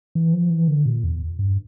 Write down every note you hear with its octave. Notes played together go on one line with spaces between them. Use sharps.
E3
F3
E3
D3
A#2
E2
G2